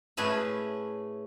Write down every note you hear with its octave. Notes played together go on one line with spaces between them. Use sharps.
A2 C#4 G#4 B4 E5